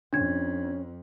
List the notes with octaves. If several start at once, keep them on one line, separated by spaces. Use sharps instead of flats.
F2 C#4 D4 G#6